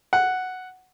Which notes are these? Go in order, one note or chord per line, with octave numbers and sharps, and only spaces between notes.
F#5